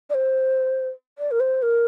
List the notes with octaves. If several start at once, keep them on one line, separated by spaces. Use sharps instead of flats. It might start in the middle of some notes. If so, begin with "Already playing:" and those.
D5
C5
D5
A#4
C5
A#4